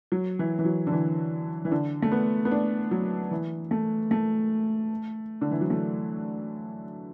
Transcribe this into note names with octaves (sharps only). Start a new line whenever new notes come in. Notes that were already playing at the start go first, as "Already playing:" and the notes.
F#3
E3
E3
F#3
D3
E3
E3
D3
A3
B3
B3
D4
F#3
E3
A3
A3
D3
E3
F#3
A3